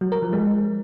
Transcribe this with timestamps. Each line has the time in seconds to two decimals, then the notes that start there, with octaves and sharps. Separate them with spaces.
0.01 F#3
0.12 A#4
0.22 F3
0.33 G#3